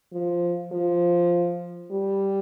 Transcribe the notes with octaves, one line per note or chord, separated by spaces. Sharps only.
F3
F3
G3